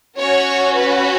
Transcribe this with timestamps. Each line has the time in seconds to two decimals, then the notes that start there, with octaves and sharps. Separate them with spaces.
0.18 C#4 F#4 C#5
0.74 B4